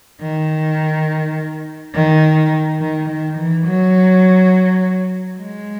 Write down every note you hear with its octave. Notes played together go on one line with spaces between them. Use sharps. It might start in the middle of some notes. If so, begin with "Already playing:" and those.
D#3
D#3
D#3
D#3
E3
F#3
G#3